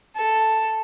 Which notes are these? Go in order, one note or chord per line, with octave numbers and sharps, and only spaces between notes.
A4